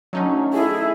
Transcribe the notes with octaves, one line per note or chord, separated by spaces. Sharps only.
D3 D#3 F#3 A3 C#4 D#4
E4 G#4 A4